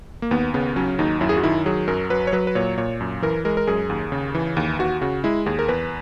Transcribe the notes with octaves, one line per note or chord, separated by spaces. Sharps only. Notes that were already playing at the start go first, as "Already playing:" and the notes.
A#3
D#2 B3
C#3 B3
F#3 C#4
D#2 D#4
F#2 E4
G#4
F#4
D#3 E4
F#3 G#4
F#2 A#4
F#3 B4
C#5
F#3 B4
B4
A#2 C#5
A#2 C#5
F#2
E3 A#4
G#3 A#4
A#4
F#2 G#4
D#2
C#3
E3
D#2
D#2 F#4
C#3 F#4
G#3 E4
D#2 G#4
A#4
E2 B4